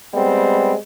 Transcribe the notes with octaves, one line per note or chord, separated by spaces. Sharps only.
G3 G#3 B3 C4